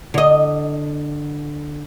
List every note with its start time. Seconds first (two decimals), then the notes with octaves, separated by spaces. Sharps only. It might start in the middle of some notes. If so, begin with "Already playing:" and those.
0.14 D3 D#5